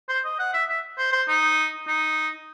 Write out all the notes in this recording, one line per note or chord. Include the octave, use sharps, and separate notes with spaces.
C5
D#5
F#5
E5
E5
C5
C5
D#4
D#4